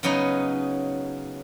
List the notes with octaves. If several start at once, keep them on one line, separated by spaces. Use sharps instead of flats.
C#3 F#3 B3 C#4 D#4